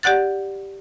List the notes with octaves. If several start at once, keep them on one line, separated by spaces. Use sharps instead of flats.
G4 D5 F#5 F#6 A6